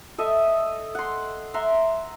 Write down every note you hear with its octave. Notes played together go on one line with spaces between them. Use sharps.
A4 D#5 E5
F#5 C6
E5 F#5 A#5 C6